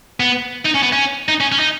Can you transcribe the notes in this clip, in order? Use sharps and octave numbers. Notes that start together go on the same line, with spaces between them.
B3
D#4
C#4
B3
C#4
D#4
C#4
C#4
D#4